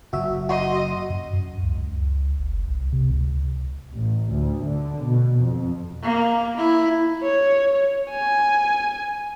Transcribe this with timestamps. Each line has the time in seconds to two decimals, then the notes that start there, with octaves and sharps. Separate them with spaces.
0.13 F#1 F#4 E5
0.49 F#4 D#5 C6
1.10 F#2
1.33 F#2
1.63 C#2
1.78 C#2
2.38 F#1
2.68 C2
2.92 C3
3.11 C#2
3.94 A1
4.32 D2
4.66 D3
5.06 B2
5.39 F2
6.03 A#3
6.57 E4
7.23 C#5
8.11 G#5